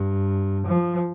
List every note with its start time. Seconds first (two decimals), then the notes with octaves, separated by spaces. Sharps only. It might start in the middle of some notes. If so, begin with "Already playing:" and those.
Already playing: G2
0.67 F3